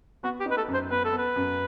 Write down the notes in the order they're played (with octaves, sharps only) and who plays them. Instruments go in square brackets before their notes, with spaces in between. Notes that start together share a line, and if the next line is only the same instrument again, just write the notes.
[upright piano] B3 [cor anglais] F#4
[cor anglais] G4
[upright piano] D#4 [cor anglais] B4
[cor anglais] A4
[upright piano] F#2
[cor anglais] C5
[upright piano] B3 [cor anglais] B4
[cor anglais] A4
[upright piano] B3
[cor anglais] B4
[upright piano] F#2